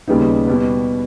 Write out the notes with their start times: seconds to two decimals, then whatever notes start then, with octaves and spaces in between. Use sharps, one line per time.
0.08 D#2 C#3 G3 B3 D#4
0.47 B2 G3 B3